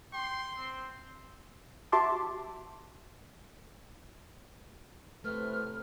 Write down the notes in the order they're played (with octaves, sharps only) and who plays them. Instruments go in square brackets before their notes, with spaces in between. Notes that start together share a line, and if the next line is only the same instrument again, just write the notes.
[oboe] G5 [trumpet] C6
[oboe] C4
[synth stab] F#4 G4 E5 A5 C6 D6
[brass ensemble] A2 C3 [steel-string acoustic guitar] A3 [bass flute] B4 [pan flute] F6